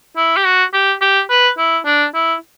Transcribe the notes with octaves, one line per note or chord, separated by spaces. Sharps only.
E4
G4
F#4
G4
G4
B4
E4
D4
E4